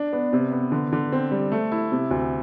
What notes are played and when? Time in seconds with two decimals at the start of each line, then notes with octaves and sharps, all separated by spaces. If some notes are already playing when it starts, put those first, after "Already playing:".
Already playing: D4
0.13 B3
0.33 C3
0.52 B3
0.72 D3
0.93 D3
1.12 C4
1.31 G3
1.52 A3
1.72 E4
1.92 C3
2.11 D2